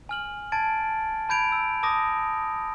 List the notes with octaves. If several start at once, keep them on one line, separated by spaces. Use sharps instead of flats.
G#5 F6 F#7
A5 G#6 A6 D7
A5 B5 G6 G#6 D7 F7
E6
A5 D6 D#6 A#6